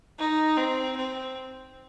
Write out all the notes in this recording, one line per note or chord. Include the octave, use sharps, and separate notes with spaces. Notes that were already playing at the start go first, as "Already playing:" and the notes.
D#4
C4
C4